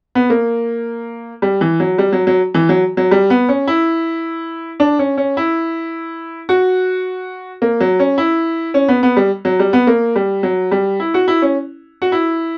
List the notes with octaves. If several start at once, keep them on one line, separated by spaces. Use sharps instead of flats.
B3
A#3
G3
E3
F#3
G3
F#3
F#3
E3
F#3
F#3
G3
B3
C#4
E4
D4
C#4
C#4
E4
F#4
A#3
F#3
C#4
E4
C#4
B3
B3
G3
F#3
G3
B3
A#3
G3
F#3
G3
E4
F#4
E4
C#4
F#4
E4